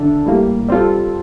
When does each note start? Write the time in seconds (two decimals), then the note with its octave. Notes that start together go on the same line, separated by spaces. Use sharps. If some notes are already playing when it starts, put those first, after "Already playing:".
Already playing: D3 A3 D4 A4
0.26 A2 G3 A#3
0.68 G3 C4 F4 A4